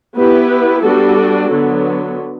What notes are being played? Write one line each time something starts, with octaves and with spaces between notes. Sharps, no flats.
B3 E4 G4 B4
G3 B3 D4 F#4 A4
D3 F#3 B3